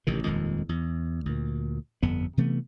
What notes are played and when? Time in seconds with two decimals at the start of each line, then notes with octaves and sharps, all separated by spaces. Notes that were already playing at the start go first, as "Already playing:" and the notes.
0.07 A1 C3 D#3
0.24 D#1 F2 D#3 G#3
0.69 E2
1.26 D2 A#2
2.03 G1 F2 B3
2.37 C3 E3 A3 B3